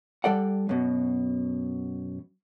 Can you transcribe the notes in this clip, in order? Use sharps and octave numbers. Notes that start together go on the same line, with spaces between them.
G3 A4 D5 F#5
F#2 B2